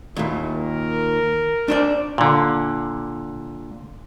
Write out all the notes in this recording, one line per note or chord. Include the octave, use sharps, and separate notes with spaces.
D#2 A#2 E4
A#4
D4 C5 D5
A#2 D3